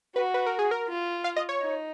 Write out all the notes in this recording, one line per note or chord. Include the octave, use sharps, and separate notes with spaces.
F#4 B4
B4
A#4
G#4
A#4
F4
F5
D#5
C#5
D#4